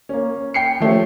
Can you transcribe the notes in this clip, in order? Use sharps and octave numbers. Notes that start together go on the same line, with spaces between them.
A#3 C#4
G5 C7 C#7
F3 A3 C#4 G4